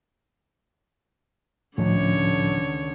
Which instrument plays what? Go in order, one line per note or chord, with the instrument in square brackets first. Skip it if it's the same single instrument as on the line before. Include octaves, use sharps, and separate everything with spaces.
[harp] C#2 D#3 A3 [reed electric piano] A2 F3 [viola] D3 C#5